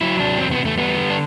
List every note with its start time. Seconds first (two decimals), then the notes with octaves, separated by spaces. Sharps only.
0.01 F#3 E4
0.19 C3 D4
0.39 E2 C4
0.51 B3
0.58 E2
0.65 A3
0.77 G3 B3
0.97 D3
1.10 D4